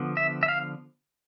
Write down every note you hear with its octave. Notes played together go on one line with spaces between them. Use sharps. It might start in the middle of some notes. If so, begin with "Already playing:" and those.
Already playing: D3 F3 B3
E5
E5
F5